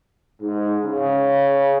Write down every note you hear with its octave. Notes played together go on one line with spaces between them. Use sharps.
G#2
C#3